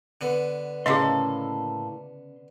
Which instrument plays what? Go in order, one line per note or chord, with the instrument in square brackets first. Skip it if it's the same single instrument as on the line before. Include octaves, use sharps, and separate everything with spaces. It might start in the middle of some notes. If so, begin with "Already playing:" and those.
[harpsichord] D3 B3
[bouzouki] A2 A#3 A4 [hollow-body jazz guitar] C#3 C6 [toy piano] G#4 D#5